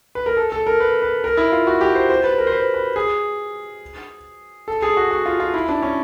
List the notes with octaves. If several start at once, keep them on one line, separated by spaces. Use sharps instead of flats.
B4
A#4
A4
A4
A#4
B4
B4
A#4
E4
F4
F#4
G4
C5
C5
B4
A#4
C5
B4
B4
G#4
A4
G#4
F#4
F#4
F4
F4
E4
D4
C#4